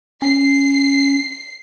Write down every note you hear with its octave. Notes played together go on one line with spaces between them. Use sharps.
C#4 C7